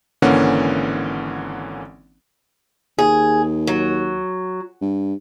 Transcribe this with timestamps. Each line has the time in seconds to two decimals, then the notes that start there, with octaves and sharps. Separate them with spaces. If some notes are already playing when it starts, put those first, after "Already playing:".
0.22 G#1 D3 E3 A#3 C#4 F#5
2.99 D#2 G#4
3.67 F#3
4.81 G2